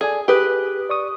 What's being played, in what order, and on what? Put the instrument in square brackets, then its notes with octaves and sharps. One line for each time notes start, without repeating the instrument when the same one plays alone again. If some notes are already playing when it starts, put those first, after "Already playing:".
[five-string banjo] G#4 [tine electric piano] A4 D5 G#5
[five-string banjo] G4 B4 [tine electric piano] G#4 D#6 F#6
[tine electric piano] D5 C#6 D#6